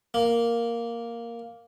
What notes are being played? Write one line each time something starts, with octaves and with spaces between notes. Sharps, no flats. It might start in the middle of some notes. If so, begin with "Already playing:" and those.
A#3